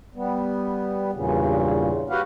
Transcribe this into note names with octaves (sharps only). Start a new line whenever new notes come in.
G3 B3
E2 G2 A#2 C#3
F#4 G4 B4 F5 F#5